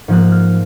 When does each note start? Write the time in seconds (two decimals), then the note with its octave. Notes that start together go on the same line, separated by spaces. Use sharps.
0.08 G#2 F3 A#3 F#6
0.32 F6